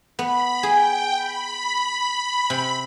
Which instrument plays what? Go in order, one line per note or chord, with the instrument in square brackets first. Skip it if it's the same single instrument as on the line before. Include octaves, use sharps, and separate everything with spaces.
[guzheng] B3 [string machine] B5
[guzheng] G#4 [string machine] G5
[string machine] B5
[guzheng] C3